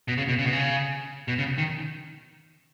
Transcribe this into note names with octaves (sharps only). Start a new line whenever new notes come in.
B2
C#3
B2
C#3
B2
C#3
B2
C#3
D#3